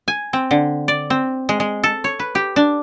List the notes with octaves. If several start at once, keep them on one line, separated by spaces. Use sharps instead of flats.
G#5
C4
D3
D5
C4
G#3
G#3
A4
C#5
B4
G4
D4